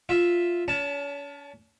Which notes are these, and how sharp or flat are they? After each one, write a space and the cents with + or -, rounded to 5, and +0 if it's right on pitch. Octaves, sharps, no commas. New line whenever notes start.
F4 +0 E5 +0
C#4 +40 A5 +0